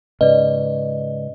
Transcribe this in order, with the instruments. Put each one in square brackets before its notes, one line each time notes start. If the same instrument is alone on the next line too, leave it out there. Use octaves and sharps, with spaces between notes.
[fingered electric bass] G#2 C#3 [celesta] B4 D5 [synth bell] D#5